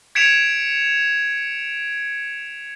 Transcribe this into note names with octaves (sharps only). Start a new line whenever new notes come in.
G#6 B6 C#7 D7 E7 F7